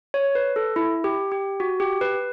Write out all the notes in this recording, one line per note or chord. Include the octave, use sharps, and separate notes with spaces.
C#5
B4
A4
E4
G4
G4
F#4
G4
B4